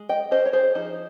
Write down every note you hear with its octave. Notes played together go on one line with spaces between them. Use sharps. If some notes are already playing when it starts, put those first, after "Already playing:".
Already playing: G#3
D#5 G5
C#4 C5 D#5
C#5
G#4 C5
F3 D#4